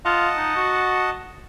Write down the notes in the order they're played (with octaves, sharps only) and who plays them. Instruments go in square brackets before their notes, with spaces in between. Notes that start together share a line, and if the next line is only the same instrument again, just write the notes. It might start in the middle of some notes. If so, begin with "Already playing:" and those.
[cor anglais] F4 [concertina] D#5 F#5 A5
[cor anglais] D#4
F#4